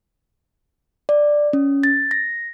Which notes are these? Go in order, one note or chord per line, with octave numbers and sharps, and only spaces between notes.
D5
C#4
A6
A#6